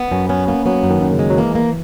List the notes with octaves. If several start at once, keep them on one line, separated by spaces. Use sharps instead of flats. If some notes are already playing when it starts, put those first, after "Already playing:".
Already playing: B3
F#2 C#4
B3 C#4
A#3 B3
F#3 B3
F#2
D#3
F#2
C#3
G#3
F#3
E3 A#3
A#3